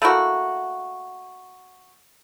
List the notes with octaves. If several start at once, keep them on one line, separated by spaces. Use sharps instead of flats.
A3 A#3 E4 F#4